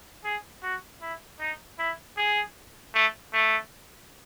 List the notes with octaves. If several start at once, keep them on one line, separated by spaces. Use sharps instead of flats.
G#4
F#4
E4
D#4
E4
G#4
A3
A3